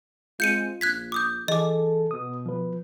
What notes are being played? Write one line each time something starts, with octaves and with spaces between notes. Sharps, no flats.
G#3 C4 F4 G6 C#7 D#7
A#1 F#6 G#6 B6
D6 D#6 G6
E3 G#4 A4 D#5 D6
B2 D#6
F3 B4